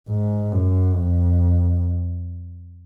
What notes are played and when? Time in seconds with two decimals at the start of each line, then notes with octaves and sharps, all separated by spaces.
0.10 G#2
0.52 F#2
0.95 F2